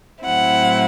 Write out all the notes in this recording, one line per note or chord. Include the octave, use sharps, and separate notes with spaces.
A2 F#3 C4 E4 F#5